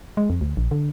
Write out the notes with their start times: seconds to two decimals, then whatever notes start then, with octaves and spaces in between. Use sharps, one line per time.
0.17 G#3
0.30 F2
0.41 D2
0.57 A#1
0.71 D3